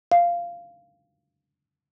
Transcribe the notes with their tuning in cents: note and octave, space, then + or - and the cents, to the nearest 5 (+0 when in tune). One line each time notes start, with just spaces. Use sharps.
F5 -10